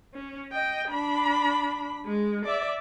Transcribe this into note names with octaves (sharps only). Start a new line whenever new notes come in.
C#4
D#5 G5
D4 B5
G#3
D5 E5